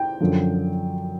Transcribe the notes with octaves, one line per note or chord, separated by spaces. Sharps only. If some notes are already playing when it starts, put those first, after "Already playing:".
Already playing: G5
F#2 D3 F3